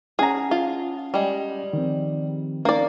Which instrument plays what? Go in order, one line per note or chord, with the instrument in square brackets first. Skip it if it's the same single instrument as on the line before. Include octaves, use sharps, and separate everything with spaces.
[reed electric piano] C#4 F#5 A5 [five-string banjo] G#4 A#5
[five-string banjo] F4
G3 G#3
[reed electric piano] D#3 F3 C4
[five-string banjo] A#3 D5 [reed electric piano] C#4 D#4